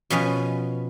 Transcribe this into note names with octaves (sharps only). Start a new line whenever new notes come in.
B2 F3 C#4 B4